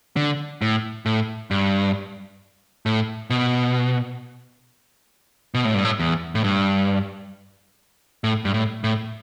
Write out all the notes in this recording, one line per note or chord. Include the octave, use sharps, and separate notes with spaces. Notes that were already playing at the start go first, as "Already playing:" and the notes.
D3
A2
A2
G2
A2
B2
B2
A2
G2
A2
E2
A2
G2
A2
G2
A2
A2